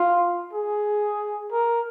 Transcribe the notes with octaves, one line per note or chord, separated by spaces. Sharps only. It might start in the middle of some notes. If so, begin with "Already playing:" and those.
Already playing: F4
G#4
A#4